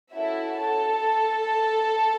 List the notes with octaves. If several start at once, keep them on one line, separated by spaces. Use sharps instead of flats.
C#4 E4 F#4 A4 E5
A4 A5